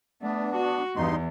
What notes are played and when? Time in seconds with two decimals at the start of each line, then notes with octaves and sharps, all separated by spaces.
0.22 A3 B3 D4
0.56 F#4
0.96 E2 G2 D#4 C6